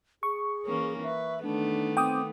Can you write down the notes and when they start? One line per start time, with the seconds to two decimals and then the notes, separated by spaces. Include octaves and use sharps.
0.23 G#4 C#6
0.65 E3 A#3 C#4
1.03 B4 E5
1.43 D#3 A3 B3 D4
1.97 C4 G5 D6 D#6